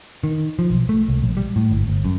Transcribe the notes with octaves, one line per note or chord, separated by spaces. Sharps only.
D#3
F3
B1
A3
C2
A#1
G3
A2
G1
G1
F#2